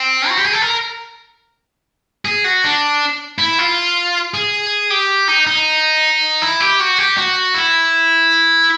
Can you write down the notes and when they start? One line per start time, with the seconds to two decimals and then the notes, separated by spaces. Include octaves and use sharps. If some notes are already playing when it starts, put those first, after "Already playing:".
Already playing: C4
0.29 F#4
0.37 G4
0.46 G#4
0.53 A4
0.62 A#4
2.25 G#4
2.44 F#4
2.64 D4
3.38 E4
3.59 F4
4.34 G#4
4.90 G4
5.28 D#4
5.47 D#4
6.42 E4
6.60 G4
6.80 F#4
6.98 G4
7.17 F#4
7.54 E4